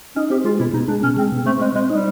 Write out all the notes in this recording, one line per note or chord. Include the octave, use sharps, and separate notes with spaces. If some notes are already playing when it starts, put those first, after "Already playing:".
C#4 D#4
C4 G4
G#3 F4
B2 E4
B2 D#4
G#3 D4
B2 C#4
G#3 C4
B2
A3 C4
G#3 C4
G#3 C4
G3 D#4